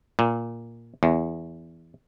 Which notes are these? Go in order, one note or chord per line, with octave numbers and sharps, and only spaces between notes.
A#2
E2